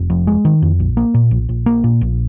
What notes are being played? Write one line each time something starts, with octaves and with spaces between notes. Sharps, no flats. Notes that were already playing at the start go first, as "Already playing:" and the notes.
Already playing: F1
F2
G#3
D#3
F2
A#1
A#3
A#2
A#1
A#1
A#3
A#2
A#1